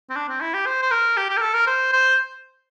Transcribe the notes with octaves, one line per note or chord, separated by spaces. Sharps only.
C4
D4
C4
E4
G4
C5
C5
A#4
G4
G4
A#4
A4
A#4
C5
C5